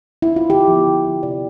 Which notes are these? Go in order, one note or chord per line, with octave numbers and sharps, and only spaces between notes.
E4
F4
D3 G4
F3 B3
D3
F3 B3
C3 D5